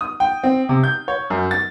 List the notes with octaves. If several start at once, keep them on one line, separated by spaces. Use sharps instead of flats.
D#6
G5
C4
C3
G6
C#5
F#2
A6